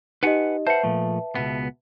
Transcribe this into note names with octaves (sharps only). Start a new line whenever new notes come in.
D#4 G4 B4 D#5 F#5 G#5
B4 C5 E5 F#5 A5
A#2 F3 A3
C#2 B2 B3